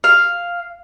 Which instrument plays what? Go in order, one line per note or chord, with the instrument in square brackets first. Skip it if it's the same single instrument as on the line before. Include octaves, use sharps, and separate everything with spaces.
[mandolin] F5